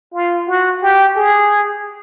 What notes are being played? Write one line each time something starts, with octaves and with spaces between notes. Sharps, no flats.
F4
F#4
G4
G#4